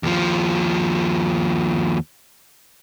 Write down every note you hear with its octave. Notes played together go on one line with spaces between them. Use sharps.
D#2 F3